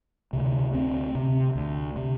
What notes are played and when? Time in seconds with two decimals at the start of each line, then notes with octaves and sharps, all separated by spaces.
0.33 D2 C3
0.74 D2 C4
1.15 C3
1.56 D2
1.96 C3